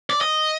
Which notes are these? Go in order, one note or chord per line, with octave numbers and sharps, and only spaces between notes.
D5
D#5